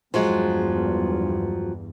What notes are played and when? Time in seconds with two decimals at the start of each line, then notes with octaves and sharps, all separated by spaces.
0.14 E2 G2 F3 F#3 G#3